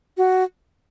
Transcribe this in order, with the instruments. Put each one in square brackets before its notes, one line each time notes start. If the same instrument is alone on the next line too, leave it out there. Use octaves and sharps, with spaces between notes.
[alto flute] F#4